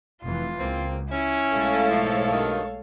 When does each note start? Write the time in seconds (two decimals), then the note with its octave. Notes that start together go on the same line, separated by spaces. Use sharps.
0.22 F1 E3 F4
0.59 C#2 A#3 C4
1.11 C#4 E4
1.52 B1 G#3 A3 A4 C#5 F5
1.90 G#2 F3
2.32 G2 B2 D#3